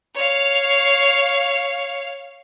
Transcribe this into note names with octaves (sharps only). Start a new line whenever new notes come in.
C#5 F5